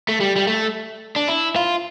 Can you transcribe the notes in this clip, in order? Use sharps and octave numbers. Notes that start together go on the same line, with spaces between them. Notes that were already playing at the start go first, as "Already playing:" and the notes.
A3
G3
G3
A3
D4
E4
F4